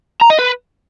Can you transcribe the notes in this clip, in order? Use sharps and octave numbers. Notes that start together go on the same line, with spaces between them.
A#5
D#5
B4